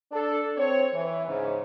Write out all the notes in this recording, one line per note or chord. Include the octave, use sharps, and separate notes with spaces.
D4 A4
C4 C#5
E3
G#2 C#3